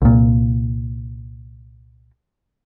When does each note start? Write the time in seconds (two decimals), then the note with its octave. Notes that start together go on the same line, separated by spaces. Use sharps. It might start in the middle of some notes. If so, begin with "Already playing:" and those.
0.02 C2 A#2